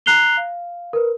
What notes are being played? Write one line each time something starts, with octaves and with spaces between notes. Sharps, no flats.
A#5 F#6 C7 F7 G7
F5
A#4 B4